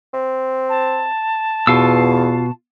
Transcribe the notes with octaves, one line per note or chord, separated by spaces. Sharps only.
C4
A5
E2 B2 F4 F5 E6